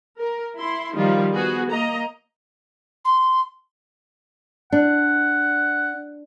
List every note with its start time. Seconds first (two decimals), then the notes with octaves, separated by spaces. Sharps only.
0.20 A#4
0.57 E4 C6
0.96 D#3 F3 G3 F4
1.33 B3 F#4 G#4
1.69 A#3 D#5 A#5
3.05 C6
4.72 D4 F#5